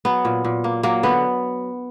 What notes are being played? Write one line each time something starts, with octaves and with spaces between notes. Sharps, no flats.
F#3 B3
A#2
A#2
A#3
F#3 A#3
D3 B3